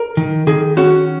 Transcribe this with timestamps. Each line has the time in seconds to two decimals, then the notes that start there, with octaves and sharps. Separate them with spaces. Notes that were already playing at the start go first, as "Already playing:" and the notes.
Already playing: A#4
0.17 D#3
0.47 D#3 G#4
0.77 C#4 F#4